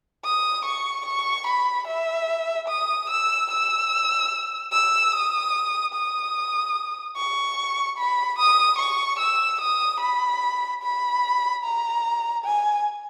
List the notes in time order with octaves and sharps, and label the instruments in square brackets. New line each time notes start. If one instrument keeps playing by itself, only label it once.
[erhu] D#6
C#6
C#6
B5
E5
D#6
E6
E6
E6
D#6
D#6
C#6
B5
D#6
C#6
E6
D#6
B5
B5
A#5
G#5